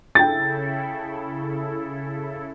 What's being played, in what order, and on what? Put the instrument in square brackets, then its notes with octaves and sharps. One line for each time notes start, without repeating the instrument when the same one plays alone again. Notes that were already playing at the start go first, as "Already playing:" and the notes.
[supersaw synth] C#3 E4 A4 [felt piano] G5 A6